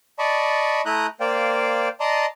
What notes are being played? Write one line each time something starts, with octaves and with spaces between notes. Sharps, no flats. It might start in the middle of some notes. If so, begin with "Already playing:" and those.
D5 D#5 A5 B5 C#6
A3 E4 A#5 D#6 F#6 G6
A#3 C5 D5 F5 G5
D5 D#5 A5 A#5 C6 D#6